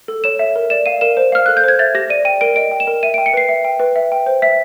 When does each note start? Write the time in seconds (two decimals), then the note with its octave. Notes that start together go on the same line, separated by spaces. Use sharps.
0.08 A4
0.24 C#5 E7
0.39 E5
0.56 A#4
0.70 D5 E7
0.86 F5 D#7
1.01 A#4 E7
1.17 C5
1.32 F5 F6
1.46 A4 F#6
1.57 G6
1.64 C5 G#6
1.79 E5 A6
1.94 G4 A#6
2.10 D5 D#7
2.25 G5 D#7
2.41 A#4 D7
2.56 D#5 D7
2.71 G5
2.80 E7
2.87 A#4
3.03 E5 D#7
3.14 G5 D7
3.26 C#7
3.33 B4 C7
3.49 E5
3.65 G5
3.80 B4
3.96 E5
4.12 G5
4.26 C5
4.42 E5 B6